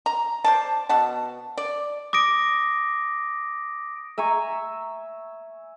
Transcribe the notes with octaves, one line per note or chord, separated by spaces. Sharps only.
A#5
C5 D5 A5
B2 F#5 A5
D5
D6 D#6 A#6 D7
E5 G#5 A#5 C#6